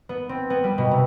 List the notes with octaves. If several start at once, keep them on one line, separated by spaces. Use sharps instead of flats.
B3
C4
B3
G3
B2
C3